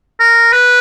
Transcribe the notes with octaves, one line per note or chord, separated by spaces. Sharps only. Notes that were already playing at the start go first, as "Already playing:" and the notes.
A#4
B4